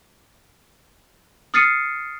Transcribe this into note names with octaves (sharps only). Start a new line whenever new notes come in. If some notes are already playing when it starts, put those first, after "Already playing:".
D#6 F6 A6 C7 C#7 D#7